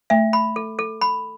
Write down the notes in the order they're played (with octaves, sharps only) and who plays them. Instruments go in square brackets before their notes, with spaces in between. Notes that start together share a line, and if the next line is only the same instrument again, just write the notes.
[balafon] A3 [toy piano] E5
[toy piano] B5
A4
A4
B5